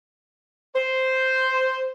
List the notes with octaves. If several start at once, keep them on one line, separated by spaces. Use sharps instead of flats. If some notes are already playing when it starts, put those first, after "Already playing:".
C5